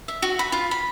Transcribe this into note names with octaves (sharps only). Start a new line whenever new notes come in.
E5
F#4
B5
F4
B5